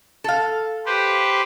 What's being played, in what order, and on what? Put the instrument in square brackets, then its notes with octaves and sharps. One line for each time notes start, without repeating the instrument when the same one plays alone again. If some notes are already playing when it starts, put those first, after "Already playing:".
[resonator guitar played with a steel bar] A4 F5
[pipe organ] G4 B4 C5